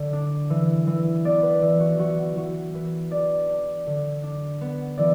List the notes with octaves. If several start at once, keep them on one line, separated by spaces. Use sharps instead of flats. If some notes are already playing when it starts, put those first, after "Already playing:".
Already playing: D3
D4
E3
E3
B3 D5
B4
E3
F#4
E3 F#4
E3 F#4
E3 B4
D4 D5
D4
D3
D4
B3
E3 D5